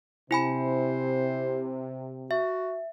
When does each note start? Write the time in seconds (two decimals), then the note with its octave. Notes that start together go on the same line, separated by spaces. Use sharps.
0.31 C3 E4 C5 G#5 B5
2.31 F#4 E5